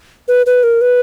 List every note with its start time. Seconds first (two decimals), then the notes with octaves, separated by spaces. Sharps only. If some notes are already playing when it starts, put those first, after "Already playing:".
0.28 B4
0.46 B4
0.63 A#4
0.81 B4